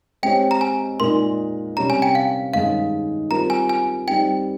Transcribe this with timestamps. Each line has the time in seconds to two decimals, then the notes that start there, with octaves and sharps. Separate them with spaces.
0.23 G#3 C4 G4 C#5 G5
0.51 A#5
0.61 G#5
1.00 A#2 G#3 D#4 A#4 C6
1.77 C3 G3 C#4 A#5
1.90 G#5
2.02 G5
2.15 F5
2.54 G2 D#3 G#3 C#4 G#4 F5
3.30 G3 C4 F4 A#4 A#5
3.50 G#5
3.69 G#5
4.07 G3 C4 D#4 G5